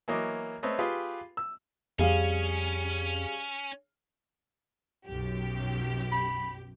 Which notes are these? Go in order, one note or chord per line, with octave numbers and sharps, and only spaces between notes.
E3 F#3 A#3 C#5 D#5 D6
A3 C4 A4 B4 C#5 D#5
F4 G4 G#4 B4
E6
F2 G3 C#4 G#4 F5
B1 F#2 G4
B5